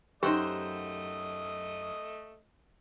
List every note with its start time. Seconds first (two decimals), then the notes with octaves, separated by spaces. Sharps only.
0.23 F#2 A3 D#4 G4 C5 D#5 F#5 G5